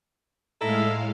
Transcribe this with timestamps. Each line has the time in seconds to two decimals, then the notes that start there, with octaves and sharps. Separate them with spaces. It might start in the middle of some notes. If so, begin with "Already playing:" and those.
0.61 A2 G#3 D#4 E4 A4 F5